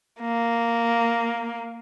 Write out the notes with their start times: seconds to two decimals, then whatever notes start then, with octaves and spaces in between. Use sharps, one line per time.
0.21 A#3